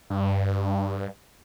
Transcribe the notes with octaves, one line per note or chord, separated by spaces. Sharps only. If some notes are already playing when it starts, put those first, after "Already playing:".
G2